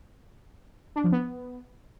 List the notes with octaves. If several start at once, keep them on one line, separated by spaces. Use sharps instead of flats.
D4
F3
B3